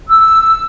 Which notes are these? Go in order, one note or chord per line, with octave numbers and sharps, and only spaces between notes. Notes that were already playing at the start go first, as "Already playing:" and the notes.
E6